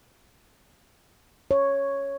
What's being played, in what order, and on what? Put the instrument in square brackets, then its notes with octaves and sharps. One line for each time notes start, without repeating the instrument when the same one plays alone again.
[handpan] C#5